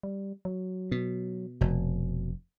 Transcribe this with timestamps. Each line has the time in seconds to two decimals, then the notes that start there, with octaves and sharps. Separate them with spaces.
0.03 G3
0.45 F#3
0.92 B2
1.61 F1 B2